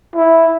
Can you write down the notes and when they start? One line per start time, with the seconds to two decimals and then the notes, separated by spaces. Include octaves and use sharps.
0.15 E4